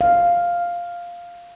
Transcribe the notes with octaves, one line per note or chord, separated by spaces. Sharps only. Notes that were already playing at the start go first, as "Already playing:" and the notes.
F5